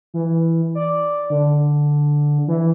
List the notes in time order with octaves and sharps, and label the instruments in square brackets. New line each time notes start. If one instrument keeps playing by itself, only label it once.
[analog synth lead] E3
D5
D3
E3